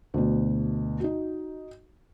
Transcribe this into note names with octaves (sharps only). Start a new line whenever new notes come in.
D2 B2
D#4 F#4